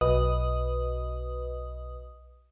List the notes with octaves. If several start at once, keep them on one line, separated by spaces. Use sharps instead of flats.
B1 B4 D#5 D#6